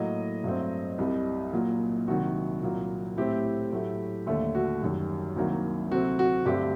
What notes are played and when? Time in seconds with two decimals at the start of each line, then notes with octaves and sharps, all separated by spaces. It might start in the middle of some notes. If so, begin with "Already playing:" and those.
Already playing: A2 F#3 A#3 D#5
0.44 G2 F#3 A3 C4
0.98 C2 C3 G3
1.53 A#2 F#3 A#3
2.07 C2 C3 D#3 F#3 F#4
2.63 C2 A#2 F#3 A#3
3.17 A2 A3 C4 G4
3.72 A2 F#3 A3
4.26 D#2 D3 A3
4.55 F#4
4.82 F#2 D#3 G3
5.36 C2 C3 D#3 F#3 A#3
5.91 D2 C3 F#3 C4 F#4
6.19 F#4
6.45 G2 D3 A3 C4 G4